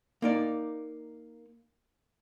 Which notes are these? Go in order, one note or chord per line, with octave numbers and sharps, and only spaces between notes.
A#3 D#4 D5